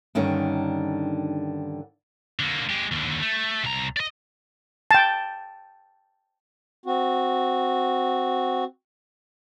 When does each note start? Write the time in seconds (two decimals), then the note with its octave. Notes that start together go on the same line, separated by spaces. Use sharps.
0.15 G2 D3 D#3 C#4 D#4
2.40 D3 A#3
2.70 G#3 G4
2.92 D#2 D3
3.21 A3
3.64 C2 A#5
3.97 D5 D#5
4.91 G5 A5
6.86 C4 F#4